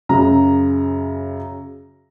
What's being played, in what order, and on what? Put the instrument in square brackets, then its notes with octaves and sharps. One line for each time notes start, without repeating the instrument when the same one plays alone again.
[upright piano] F#2 C#3 A#5